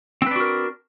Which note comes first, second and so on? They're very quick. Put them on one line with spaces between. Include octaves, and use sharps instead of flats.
C4 B4 D4 F#4 A#4